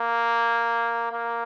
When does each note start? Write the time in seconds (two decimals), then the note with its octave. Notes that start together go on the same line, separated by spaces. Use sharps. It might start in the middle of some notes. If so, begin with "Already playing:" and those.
Already playing: A#3
1.12 A#3